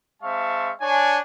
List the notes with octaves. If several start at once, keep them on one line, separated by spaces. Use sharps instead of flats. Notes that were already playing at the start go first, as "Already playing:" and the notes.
G#3 C4 E5 F5 A5 C#6
D4 C#5 G#5